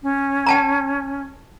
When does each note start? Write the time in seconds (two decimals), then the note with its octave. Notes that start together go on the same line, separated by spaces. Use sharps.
0.03 C#4
0.46 G5 A5 A#5